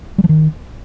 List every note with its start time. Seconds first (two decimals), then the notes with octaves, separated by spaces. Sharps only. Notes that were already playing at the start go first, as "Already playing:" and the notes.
0.18 G3
0.24 F3
0.29 D#3